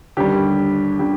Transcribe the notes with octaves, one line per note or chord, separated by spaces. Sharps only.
D#2 D3 G3 G4
D3 G3 G4